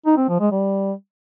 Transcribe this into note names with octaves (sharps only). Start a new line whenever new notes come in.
D#4
C4
F3
G#3
G3